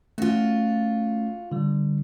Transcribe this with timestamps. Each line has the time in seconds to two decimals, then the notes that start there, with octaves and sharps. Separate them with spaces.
0.18 A3 C#4 F4 F#4
1.52 D3 G3